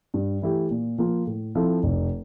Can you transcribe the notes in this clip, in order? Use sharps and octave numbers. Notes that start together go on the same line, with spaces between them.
G2
E3 A3 E4 G4
A#2
F3 A#3 F4
A2
F3 C4 E4 A4
F1